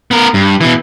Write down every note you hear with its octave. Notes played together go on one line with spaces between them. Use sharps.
B3 A#4
G2
B2 E3